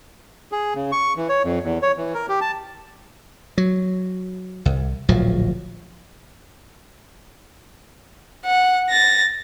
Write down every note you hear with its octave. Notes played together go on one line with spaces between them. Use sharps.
G#4
C#3
C#6
E3
C#5
F2
E2
C#5
E3
A#4
G4
A5
F#3
C2
D1 A#1 F3 F#3
F#5
A6 A#6